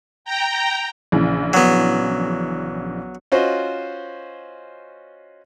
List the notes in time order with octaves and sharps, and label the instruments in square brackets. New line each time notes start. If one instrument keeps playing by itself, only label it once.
[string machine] G5 A#5
[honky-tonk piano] A#1 C#3 E3
[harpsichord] F#3 B3
[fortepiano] C#4 F4 F#4 C5 D#5